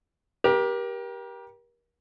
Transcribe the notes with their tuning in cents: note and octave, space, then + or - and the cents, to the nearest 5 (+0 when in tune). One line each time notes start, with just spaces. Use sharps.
G4 +0 A#4 +35